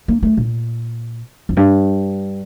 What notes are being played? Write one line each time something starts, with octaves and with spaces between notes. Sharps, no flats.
A#3
A3
A#2
F2
G2